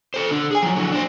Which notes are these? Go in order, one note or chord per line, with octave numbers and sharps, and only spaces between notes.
A4 C5
D3
G#4 G#5
F3 F#3
D3 F#3
D4 C5